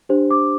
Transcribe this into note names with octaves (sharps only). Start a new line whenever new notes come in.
D4 G4 C5
D6